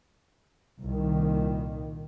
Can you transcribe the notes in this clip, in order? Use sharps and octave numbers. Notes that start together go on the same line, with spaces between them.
C2 A#2 D#3